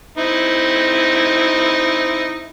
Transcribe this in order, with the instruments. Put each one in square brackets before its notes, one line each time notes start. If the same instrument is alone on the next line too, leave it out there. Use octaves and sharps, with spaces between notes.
[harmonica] C4 D#4 E4